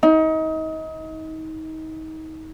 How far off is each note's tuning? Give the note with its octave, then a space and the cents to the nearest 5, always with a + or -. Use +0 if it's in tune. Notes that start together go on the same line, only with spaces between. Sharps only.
D#4 +30